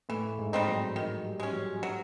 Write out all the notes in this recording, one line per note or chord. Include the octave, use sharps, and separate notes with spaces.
A2 E3 A3
G#2 G#3
G3 C4 D#4
F#3
D#3 F#3
G3
G#3 C#4
F#3
F#3